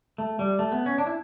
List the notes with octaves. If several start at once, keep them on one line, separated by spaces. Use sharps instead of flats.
A3
G3
A3
B3
C#4
D4
E4